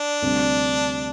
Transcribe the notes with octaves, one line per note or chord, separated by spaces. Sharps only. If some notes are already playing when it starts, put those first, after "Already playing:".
Already playing: D4
D2 C3 G3 C4